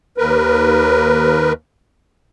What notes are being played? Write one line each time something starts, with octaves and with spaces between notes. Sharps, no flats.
D#2 A#4 B4